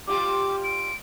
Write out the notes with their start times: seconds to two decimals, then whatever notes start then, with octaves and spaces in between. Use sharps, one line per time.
0.07 G3 F4 G4 D6
0.64 D7